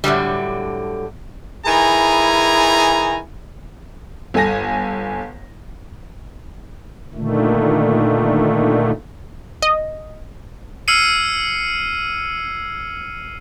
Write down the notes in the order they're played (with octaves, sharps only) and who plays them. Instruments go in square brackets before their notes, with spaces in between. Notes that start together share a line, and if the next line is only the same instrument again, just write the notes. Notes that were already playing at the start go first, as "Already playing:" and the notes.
[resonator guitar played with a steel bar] A2 D3 F#3 G3
[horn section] D#3 E4 G#4 B4 G#5 A#5
[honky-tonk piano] G1 A4 G#5 A#6
[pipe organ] A#2 D3 D#3 A3
[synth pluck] D#5
[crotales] E6 F6 G#6 C7 C#7 D#7